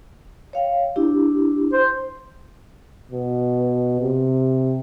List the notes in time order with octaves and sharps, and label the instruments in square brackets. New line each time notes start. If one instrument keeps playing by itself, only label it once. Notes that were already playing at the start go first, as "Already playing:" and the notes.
[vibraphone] C#5 F5 G5
D4 E4 G4
[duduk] C5
[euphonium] B2
C3